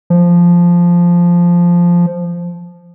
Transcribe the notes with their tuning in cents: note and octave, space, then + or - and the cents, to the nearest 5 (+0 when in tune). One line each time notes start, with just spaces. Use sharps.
F3 -5